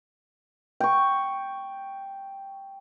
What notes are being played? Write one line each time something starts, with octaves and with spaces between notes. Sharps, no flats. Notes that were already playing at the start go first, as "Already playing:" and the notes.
G5 C#6